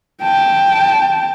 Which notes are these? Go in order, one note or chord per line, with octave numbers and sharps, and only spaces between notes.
G5 A5